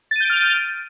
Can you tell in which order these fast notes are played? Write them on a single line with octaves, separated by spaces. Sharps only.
A6 D#7 G6 D7 F6